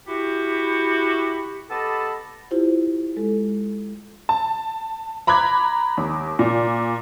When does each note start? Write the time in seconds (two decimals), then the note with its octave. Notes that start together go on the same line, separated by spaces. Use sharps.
0.07 E4 F#4 G4
1.69 B3 G4 A4 D#5 A5 B5
2.51 E4 F4 G4 C5
3.17 G#3 A4
4.29 A5
5.27 A#5 B5 D6 F#6 G#6
5.97 D#2
6.39 A#2